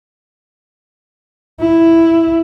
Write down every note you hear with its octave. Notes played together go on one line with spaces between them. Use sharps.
E4